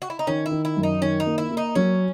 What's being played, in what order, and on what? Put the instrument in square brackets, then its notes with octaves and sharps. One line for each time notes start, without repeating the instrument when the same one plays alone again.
[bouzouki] F#4
E4
D#4
[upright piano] D#3 [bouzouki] C#4
[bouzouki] E4
[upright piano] D#3
[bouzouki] E4
[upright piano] F#2
[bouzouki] D#4
[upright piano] D#3 [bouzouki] C#4
[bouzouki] D#4
[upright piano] A#3
[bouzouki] E4
[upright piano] A#3
[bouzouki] D#4
[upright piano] F#3 [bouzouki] C#4